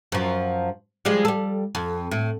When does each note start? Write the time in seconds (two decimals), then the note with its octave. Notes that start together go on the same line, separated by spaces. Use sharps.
0.12 F#2 F3
1.05 F3 G3 G#3
1.25 G3 A4
1.75 F2
2.11 A2